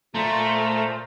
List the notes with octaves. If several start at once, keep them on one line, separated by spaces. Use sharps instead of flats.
A#2 A3 F4 C5 A#5